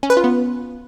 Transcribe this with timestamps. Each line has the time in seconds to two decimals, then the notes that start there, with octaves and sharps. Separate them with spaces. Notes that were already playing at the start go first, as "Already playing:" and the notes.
0.03 C#4
0.10 B4
0.17 F4
0.24 B3